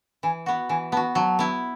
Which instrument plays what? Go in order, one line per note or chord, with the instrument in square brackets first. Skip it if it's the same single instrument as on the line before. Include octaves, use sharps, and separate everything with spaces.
[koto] E3 [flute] G#5
[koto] B3 F#4 [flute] F#5
[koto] E3 [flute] G#5
[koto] B3 F#4 [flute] A5
[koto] F#3 [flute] A5
[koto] B3 E4